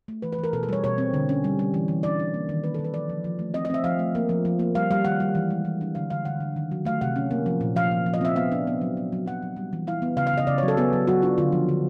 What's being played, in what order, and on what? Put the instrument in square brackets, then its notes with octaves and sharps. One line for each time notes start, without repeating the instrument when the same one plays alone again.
[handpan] A3
E3 B4
B4
E3 A#4
B2 A4
G#4
G3 C#5
B2 C#5
C4
D3
C#4
G3
G3
E3
E3
D4 D5
D4
A#3
D#3
A#3 B4
A4
D#3
B4
F3 D5
F3
F3
A3
C4 D#5
D#5
C4 E5
F3 F5
A3
A#3
F3
F3
A#3
G3 F5
G3 F5
D#3 F#5
G3
E3
G#3
E3
D4
D3 F5
D3 F5
D3 F#5
D3
D#3
F#3
A3 F5
C3 F#5
C#4
A#3
F3
A#2
F3 F5
F3
F3
D#5
C4 E5
B3 F5
D4
B3
F#3
F#3
F#3
F#3 F#5
F#3
G3
E3
E4 F5
B3
C#3 F5
F5
C#3 D#5
C#3 D5
C#5
F#3
A4
B3 G#4
F#3
F#3 F#4
D4 F4
D3 F4
F3
D3